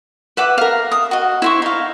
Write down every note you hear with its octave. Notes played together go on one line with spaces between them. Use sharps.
B4 E5 F#5 D6
A#4 F5
D#6
F#4 D#5
E4 C5 C#6
D#4 F5